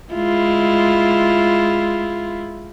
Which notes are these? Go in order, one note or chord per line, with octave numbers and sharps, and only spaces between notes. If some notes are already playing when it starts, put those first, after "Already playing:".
G#3 E4 F4